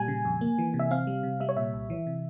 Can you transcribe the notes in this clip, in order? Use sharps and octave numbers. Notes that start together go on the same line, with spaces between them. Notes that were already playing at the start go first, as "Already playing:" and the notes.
Already playing: A#2 G3 G#5
C#3
F2
A#3
E3
C3
E5
C4 F5
G3
C3
G3 E5
C#5
A#2 E5
C2
E3
C3